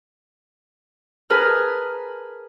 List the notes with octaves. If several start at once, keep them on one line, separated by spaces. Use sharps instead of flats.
G#4 A#4 B4 A5 F6